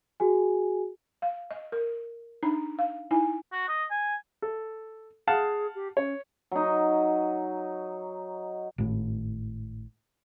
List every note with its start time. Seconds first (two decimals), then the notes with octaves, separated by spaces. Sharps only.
0.20 F#4 G#4 G#5
1.22 F5
1.51 D#5
1.72 A#4
2.43 D4 D#4 A#5
2.79 F5
3.11 D#4 E4 G#5
3.52 F#4
3.69 D#5
3.91 G#5
4.42 A4
5.27 G#4 F5 F#5 A5
5.75 G4
5.97 C#4 C#5
6.51 F#3 D#4
8.78 G#1 A2